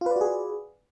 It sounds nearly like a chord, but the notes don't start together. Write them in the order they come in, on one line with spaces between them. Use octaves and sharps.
F4 B4 D5 F#4 G#4